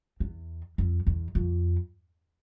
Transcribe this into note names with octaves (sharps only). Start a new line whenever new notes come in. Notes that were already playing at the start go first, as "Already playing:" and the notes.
E2
F2
E2
F2